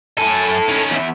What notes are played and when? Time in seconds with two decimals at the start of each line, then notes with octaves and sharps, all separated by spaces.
0.18 F#2 E4 A4 G#5
0.69 D#3 C#4
0.91 E2 E5